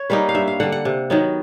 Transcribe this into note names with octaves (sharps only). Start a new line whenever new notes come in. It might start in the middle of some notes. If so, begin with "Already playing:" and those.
Already playing: C#5
G3 A#3 D#4 B4
F5
G2 E5
F5
D3 G3 F#5
F#5
C3
D#3 F#3 B3